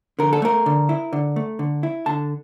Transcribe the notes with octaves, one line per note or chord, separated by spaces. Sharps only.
D3 A#4
A4
A3 A#4
D3
E4
D3
A3
D3
E4
D3 A5